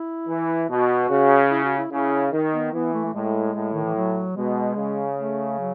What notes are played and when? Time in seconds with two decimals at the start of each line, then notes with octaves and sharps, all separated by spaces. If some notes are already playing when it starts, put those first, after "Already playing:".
Already playing: E4
0.28 E3
0.69 B2 F#4
1.09 C#3
1.50 E4
1.64 F#4
1.78 E4
1.91 C#3 E4
2.32 D#3
2.52 B3
2.72 E3 B3
2.94 A3
3.04 A3
3.14 A2 G#3
3.54 A2
3.73 D#3
3.84 E3
3.95 F#3
4.36 B2 G#3
4.77 C#3
5.18 A3
5.59 F#3